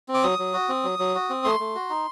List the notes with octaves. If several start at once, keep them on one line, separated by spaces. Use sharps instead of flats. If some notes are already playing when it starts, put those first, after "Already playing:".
C4
D6
F#3 D#6
F#3
F#4
C4
F#3
F#3
F#4
C4
A3 C6
A3
F#4
D#4